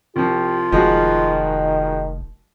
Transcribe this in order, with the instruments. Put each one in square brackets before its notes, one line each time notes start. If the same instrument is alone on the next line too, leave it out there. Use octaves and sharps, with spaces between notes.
[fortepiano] C2 F3 [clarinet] F4 [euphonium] G4
[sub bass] F1 [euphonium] D#3 [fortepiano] F3 G#3 F#4